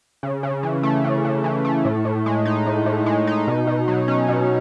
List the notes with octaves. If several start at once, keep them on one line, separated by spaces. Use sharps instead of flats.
C#3
C#3
E3
A3
C#3
C#3
E3
A3
A2
A2
G#3
D#4
A2
A2
G#3
D#4
B2
B2
F#3
C#4
B2